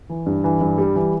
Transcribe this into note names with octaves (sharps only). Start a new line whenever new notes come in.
E3
G2
E3
G2
G3
E3